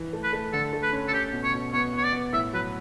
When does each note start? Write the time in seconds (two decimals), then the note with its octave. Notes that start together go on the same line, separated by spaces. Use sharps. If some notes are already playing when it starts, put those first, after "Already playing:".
Already playing: E3
0.13 A3
0.23 B4
0.33 A3
0.53 D3 A4
0.73 A3
0.82 B4
0.93 C#4
1.08 A4
1.13 C#4 G4
1.33 B2
1.44 C#5
1.53 B2
1.73 B3 C#5
1.93 B3 C#5
2.04 D5
2.13 B3
2.33 A2 E5
2.53 F#3 B4